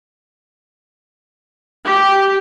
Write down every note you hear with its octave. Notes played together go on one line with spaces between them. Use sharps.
G4